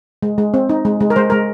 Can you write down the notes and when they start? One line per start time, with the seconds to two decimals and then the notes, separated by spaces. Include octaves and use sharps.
0.23 G#3
0.38 G#3
0.54 C4
0.69 D#4
0.85 G#3
1.00 G#3
1.10 A#4
1.16 G#3 C5
1.30 G#3 A#4